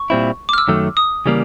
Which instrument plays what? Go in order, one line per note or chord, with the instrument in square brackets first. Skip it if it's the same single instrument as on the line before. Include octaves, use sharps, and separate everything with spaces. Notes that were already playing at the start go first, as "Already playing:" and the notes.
Already playing: [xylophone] C#6
[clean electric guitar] A#2 G3 C4 E4
[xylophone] D6
F6
E6
[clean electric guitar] F#2 D#3 F#3 A3
[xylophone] D#6
[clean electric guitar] C#3 E3 G3 A#3